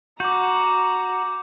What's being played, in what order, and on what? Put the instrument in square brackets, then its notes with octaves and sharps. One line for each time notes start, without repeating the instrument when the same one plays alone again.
[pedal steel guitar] F#4 [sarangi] A#5 [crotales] D6 G6